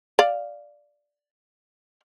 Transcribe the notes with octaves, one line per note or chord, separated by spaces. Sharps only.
D5 F5